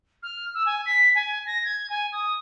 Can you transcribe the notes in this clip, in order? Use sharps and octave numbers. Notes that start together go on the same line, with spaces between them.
F6
E6
G#5
B6
G#5
A#6
G#6
G#5
D#6